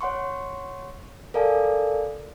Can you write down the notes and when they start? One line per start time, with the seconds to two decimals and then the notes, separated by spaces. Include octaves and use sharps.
0.01 C#5 F#5 C6 C#6
1.34 A4 A#4 D5 F5 G#5 A5